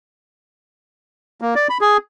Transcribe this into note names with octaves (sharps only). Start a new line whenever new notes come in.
A#3
D5
B5
G#4